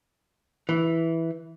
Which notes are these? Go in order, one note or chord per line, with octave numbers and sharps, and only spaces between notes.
E3